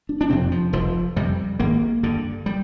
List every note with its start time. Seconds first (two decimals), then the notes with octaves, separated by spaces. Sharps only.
0.09 D4
0.21 D4
0.30 F2 C3 C4
0.52 F3
0.73 F1 F3
1.16 F2 C3 G3
1.60 G#1 A#3
2.03 G2 D3
2.46 G3